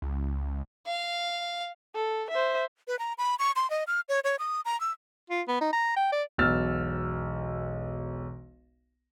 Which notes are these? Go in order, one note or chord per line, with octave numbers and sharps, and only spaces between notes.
C#2
F5
A4
C5 E5
B4
A#5
B5
C#6
C6
D#5
F6
C#5
C#5
D#6
A#5
E6
F4
B3
D#4
A#5
G5
D5
E1 B1 B2 E6 F6 A6